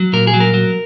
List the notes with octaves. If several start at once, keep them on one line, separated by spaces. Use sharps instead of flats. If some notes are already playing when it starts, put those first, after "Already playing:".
Already playing: F#3
A#2 A#4
G#4
F#3
A#4
F#3